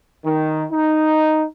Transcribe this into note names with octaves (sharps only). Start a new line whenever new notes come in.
D#3
D#4